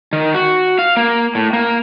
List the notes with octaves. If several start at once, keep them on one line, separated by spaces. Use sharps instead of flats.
D#3
F#4
F5
A#3
A2
A#3